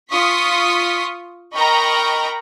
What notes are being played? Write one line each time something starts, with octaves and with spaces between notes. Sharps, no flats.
F4 C#6 D#6 B6
A#4 D#5 G5 A#5 B5 C#6